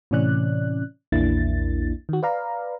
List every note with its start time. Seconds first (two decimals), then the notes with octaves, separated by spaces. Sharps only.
0.11 A2 C3 E3 C#4 D5 F#6
1.12 A#1 E2 A#3 D4 E4 A6
2.09 D#3 F#4
2.23 B4 D5 F5 A#5